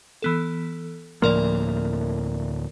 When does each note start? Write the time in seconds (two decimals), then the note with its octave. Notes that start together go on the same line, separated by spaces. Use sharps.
0.22 E3 B3 A4
1.22 D2 A2 F3 A#3 A#4 D5